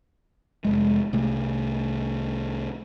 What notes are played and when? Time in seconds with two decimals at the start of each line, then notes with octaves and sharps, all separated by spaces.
0.64 F1 C#2 G#3
1.13 C2 A3